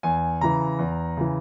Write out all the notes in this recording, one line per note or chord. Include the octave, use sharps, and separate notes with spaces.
E2 G#5
C#3 E3 A#5
E2
C#3 E3